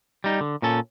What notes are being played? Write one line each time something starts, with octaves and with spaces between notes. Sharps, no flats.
G3 D#4
D3
A#2 C#4 A4